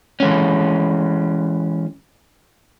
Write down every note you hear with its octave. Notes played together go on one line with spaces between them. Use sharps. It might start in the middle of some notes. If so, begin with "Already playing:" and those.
E3 G#3 C#4